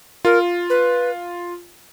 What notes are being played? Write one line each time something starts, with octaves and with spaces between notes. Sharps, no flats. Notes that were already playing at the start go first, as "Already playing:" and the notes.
F4 A#4
B4